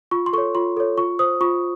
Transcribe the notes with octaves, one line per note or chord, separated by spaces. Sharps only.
F4 C#6
C6
A4 C#5 C#6
F4 C6
A4 C#5
F4 C#6
C5 D#6
F4 C#6